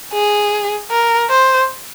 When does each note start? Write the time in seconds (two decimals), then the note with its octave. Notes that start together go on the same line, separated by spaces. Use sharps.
0.14 G#4
0.91 A#4
1.30 C5